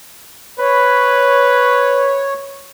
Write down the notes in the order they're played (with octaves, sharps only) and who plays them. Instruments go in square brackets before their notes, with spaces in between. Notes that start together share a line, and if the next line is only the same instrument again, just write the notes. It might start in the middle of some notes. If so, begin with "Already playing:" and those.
[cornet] B4 [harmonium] C#5